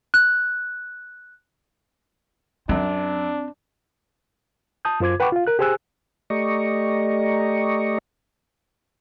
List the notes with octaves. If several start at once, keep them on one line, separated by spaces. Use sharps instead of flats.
F#6
F#2 C4 D4
A5 D#6 G6
F#2 F4 C5 D6 G#6
B4 F#5 G5 B5 C#6 D6
F4 F5
A#4 F#6
G4 G#4 C5 G#5 E6 F#6
A3 G4 D5 D#5 A#5 C#6